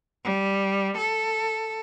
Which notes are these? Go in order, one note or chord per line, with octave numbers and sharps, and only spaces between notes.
G3
A4